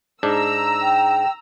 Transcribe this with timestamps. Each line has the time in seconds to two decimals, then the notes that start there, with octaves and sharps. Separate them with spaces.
0.23 G#2 D4 A#5 E6
0.82 G5